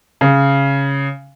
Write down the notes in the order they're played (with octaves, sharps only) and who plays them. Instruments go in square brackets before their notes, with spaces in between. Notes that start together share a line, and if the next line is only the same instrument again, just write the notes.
[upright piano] C#3